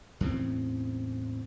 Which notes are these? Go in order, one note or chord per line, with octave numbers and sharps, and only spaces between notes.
E2 A2 C#3 C4